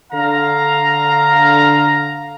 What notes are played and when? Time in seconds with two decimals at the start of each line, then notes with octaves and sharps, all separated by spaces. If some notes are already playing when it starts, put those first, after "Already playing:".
0.13 D3 F5 A#5